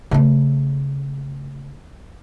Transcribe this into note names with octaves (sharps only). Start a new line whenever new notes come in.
C#3 A3